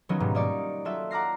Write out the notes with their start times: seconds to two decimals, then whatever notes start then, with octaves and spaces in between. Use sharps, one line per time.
0.09 D#3 F#3 B3 C#4 D#4 F4
0.20 G#2 B2 F#3 G3
0.35 A#3 D#4 D5 C#6 C#7
0.85 F#3 F4 F#4 A4 E5
1.11 F#5 A#5 D6 F6 A#6 C7